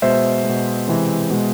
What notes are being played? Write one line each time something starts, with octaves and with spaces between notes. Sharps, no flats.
B2 G#3 C5 E5
B2 G#3
C3 E3 G#3
B2 G#3